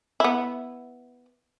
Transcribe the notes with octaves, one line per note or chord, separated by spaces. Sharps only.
B3 E4